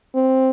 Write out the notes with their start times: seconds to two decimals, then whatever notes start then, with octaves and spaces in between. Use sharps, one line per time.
0.15 C4